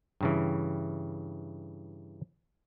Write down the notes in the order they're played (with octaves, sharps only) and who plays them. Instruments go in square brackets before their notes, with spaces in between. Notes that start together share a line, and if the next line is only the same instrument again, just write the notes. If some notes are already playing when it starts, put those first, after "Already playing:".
[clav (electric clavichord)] G2 C#3 E3